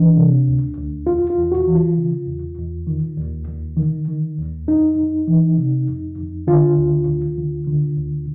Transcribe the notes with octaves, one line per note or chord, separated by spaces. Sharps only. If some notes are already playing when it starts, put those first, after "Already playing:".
Already playing: E3 D4
C3
D2
D2
E2 F4
F4
E2
F#4
E3
F4
C#3
E2
E2
D#3
D#2
D#2
D#3
D#3
D#2
F2 D#4
F2
E3
C3
F2
F2
D3 F4
D2
D2
D3
D3
D2